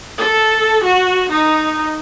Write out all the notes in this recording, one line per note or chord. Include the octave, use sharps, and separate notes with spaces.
A4
F#4
D#4